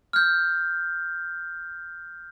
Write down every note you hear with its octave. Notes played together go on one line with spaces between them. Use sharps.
F6 G6